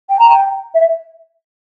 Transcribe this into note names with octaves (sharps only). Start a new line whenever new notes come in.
G5
A#5
G5
E5